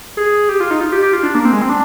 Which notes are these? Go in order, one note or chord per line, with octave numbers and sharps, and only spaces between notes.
G#4
G4
F4
D#4
F4
G4
G4
F4
D4
A#3
C4
G#3
C4
D4